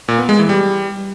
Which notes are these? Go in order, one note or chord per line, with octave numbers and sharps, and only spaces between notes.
A#2
B3
G#3
E3
G3